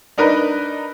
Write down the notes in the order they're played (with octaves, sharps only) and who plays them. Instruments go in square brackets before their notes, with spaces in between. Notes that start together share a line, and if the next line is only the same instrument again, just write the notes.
[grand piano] D4 D#4 A#4 B4 D#5